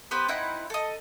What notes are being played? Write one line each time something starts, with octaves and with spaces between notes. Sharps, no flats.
B3 G4 B4 C5
C4 D#4 E4 F#5
A4 D#5